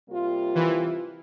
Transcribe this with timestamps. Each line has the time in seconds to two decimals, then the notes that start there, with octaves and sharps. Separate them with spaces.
0.08 C3 G3 A#3 F4
0.55 E3